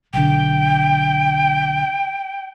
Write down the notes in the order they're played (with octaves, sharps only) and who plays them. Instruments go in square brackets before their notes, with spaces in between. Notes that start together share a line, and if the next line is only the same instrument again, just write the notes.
[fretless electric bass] B1 D3 [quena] G5